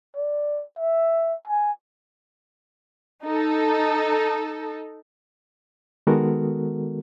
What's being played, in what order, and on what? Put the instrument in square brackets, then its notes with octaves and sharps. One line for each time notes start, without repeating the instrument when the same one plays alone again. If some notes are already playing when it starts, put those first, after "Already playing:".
[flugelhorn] D5
E5
G#5
[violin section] D#4 A4
[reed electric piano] D#3 G#3 B3 F#4 A4 A#4